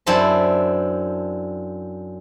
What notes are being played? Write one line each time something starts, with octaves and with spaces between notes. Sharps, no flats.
F#2 C4 D4 E4 A5 C6